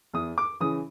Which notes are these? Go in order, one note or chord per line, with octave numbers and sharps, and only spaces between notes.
E2 D#6
D6
C#3 E3 D#6